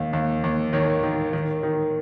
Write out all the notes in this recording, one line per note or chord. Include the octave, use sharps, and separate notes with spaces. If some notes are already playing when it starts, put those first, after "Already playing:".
Already playing: D#2 D#3
D#2
D#2
D#3 C#5
D#3
D#3
D#3